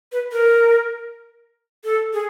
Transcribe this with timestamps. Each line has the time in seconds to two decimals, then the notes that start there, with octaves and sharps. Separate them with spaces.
0.12 B4
0.32 A#4
1.84 A4
2.13 G#4